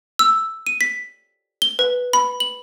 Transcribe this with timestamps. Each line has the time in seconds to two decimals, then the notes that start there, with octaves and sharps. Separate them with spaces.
0.19 E6
0.67 D#7
0.81 B6
1.62 G7
1.79 B4
2.13 B5
2.40 F#7